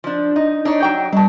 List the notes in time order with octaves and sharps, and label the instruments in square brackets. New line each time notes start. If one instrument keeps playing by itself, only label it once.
[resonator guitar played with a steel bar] F3 D4
D#4
D4 D#4 C#5
F#3 G5
[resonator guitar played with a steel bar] B2 D4 [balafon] G3 A5